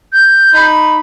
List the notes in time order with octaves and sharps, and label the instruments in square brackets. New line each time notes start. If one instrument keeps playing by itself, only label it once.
[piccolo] G6
[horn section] D#4 B5